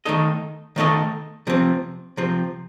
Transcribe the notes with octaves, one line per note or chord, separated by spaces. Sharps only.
D#3 A3 D#4 A4 D#5
D#3 A3 D#4 A4 D#5
C3 F3 C4
C3 F3 C4